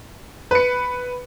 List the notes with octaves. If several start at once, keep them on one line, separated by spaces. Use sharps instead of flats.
B4 C#7